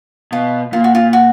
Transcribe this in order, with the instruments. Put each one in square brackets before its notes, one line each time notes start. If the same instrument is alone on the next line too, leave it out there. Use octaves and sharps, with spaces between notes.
[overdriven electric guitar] B2 [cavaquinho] F4
[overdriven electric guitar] A#2 [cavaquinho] F4
[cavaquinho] F#4
F4
F#4